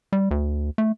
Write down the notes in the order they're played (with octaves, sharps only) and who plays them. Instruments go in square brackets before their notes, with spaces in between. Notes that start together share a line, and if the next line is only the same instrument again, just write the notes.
[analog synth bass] G3
D2
A3